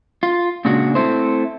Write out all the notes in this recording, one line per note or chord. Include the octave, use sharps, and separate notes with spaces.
F4
A#2 C#3 G#3 D4 F#4
A3 C4 E4 C5